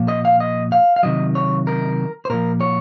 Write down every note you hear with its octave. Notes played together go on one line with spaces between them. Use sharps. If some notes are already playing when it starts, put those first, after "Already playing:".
Already playing: A#2 F3
D#5
F5
D#5
F5
F5
C3 D#3 F#3 D#5
C#5
A#4
C5
A#2 F3 A#4
C#5